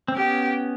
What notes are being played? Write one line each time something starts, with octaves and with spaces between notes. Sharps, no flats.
C4
B3 C#4 G4